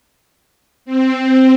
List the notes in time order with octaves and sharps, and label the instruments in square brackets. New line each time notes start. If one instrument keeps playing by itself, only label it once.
[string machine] C4